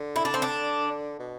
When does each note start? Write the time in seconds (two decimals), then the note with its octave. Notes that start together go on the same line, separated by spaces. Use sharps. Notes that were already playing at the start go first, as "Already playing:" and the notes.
Already playing: D3
0.16 E4
0.25 D4
0.34 C4
0.42 D4
1.19 B2